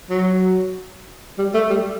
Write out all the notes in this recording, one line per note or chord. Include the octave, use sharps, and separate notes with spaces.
F#3
G3
A3
G3